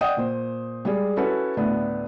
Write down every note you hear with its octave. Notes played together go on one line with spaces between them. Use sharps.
D5 D#5 F#5 G5 D#6
A#2 C5
G3 G#3 G#4 D5
C#4 E4 F#4 A4 B4 C#5
D2 A2 B3 D4